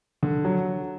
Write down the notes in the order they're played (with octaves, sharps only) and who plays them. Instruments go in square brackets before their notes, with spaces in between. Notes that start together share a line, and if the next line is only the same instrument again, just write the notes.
[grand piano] D3
F#3